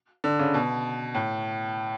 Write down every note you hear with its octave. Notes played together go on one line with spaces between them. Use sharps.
D3
C#3
B2
A2